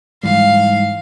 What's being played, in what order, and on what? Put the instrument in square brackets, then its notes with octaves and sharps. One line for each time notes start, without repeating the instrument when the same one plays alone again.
[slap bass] G#2 E3 G3 [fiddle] F5